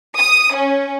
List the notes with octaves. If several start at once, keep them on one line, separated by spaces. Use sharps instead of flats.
D#6
C#4